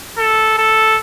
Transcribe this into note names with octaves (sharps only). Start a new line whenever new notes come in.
A4
A4